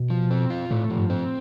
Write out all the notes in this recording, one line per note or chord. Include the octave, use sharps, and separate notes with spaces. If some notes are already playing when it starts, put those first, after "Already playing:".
Already playing: B2
F3
C4
F4
A2 A3
F3
G2
C4